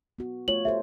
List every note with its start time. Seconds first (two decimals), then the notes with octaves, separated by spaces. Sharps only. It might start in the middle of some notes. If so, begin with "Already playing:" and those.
0.19 B3 F#4
0.48 A3 F4 C#5 F#7
0.65 G4 A4 C5 E5